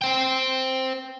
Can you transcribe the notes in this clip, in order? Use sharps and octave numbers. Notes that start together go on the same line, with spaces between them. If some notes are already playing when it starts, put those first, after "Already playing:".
C5 G5